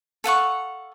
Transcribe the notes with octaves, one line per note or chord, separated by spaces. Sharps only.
A4 F5 F#5 C#6